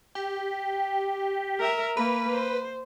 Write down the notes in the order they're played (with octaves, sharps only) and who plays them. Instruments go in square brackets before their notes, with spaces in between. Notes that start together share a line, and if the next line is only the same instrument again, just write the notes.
[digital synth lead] G4
[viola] A#4 E5
[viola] A#3 [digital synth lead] B4
[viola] C5